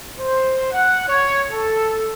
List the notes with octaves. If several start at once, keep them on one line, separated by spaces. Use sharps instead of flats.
C5
F#5
C#5
A4